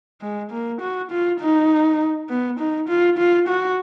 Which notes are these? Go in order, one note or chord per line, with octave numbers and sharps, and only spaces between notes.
G#3
A#3
F#4
F4
D#4
B3
D#4
F4
F4
F#4